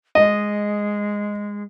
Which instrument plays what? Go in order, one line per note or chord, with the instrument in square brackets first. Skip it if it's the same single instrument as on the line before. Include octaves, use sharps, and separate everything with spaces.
[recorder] G#3 [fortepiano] D#5